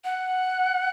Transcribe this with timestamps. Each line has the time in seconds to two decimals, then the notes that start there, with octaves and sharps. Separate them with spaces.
0.04 F#5